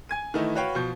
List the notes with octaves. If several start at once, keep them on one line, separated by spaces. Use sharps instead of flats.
G#5 G#6 D#7
D#3 E3 A3 D#4 E4
F#4 B4 C#5 F5 G5
B2 F3 G6